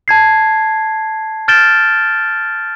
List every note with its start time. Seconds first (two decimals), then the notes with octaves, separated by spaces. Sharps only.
0.08 A5 G#6 C7
1.48 F6 G6 A6 D7 E7 G7